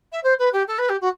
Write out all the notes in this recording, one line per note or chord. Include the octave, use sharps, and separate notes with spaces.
E5
C5
B4
G4
A4
B4
G4
F#4